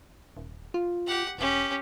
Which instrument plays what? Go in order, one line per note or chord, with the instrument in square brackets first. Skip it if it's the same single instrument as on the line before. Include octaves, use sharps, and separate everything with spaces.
[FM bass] D#1
F4
[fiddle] G4 F#5
[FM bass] E1 [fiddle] C#4 G4